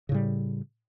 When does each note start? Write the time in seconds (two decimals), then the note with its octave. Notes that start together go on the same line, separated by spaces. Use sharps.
0.09 C#3
0.12 A2
0.14 G3